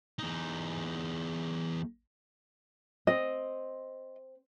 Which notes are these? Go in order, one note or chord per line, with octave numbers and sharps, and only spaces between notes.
E2 D#4
C4 D#5